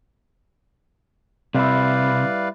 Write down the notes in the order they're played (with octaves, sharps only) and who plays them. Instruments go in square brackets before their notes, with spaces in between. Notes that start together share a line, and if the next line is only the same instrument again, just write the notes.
[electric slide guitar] C3 [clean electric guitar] G3 E4 [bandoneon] B4 D5 F5